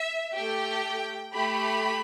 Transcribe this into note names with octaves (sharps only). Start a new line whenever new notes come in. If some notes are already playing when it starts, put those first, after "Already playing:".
Already playing: E5
A3 G4 G5
A3 G4 B5